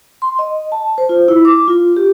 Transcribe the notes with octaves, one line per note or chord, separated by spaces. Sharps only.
C6
D#5
A5
C5
F4
E4
D6
F4
G4